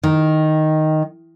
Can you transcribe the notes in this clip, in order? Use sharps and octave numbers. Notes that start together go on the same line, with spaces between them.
D#3